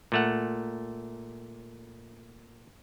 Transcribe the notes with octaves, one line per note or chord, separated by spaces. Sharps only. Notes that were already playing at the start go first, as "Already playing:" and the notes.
A#2 A3 F#5